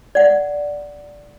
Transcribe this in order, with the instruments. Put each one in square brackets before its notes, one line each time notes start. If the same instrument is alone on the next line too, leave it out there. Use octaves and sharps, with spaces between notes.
[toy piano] D5 F#5